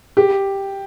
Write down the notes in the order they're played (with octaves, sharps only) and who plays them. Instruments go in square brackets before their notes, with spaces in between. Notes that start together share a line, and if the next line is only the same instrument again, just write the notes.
[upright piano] G4